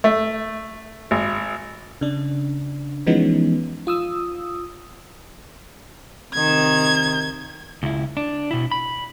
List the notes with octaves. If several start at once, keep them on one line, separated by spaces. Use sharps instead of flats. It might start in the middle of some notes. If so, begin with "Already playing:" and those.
A3
G#1
C#3 D4
E3 F3 G#3 B3 C#4 D#4
F4 D#6 E6
C3 D#3 G#6
C#2 E4
D4
B2 E4
B5